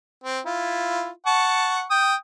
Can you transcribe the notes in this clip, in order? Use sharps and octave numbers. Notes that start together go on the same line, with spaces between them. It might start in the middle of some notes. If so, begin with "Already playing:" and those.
C4
E4 F4
F#5 A5 C#6
G5 D#6